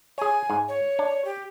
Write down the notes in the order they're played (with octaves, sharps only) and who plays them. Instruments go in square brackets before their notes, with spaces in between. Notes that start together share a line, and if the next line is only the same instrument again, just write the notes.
[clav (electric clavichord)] G#4 C#5 [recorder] G#5
[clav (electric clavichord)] G#2
[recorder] C#5
[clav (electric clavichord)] D4
[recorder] G4